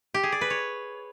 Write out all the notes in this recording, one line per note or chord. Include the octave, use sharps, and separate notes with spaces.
G4
G#4
D5
B4
C#5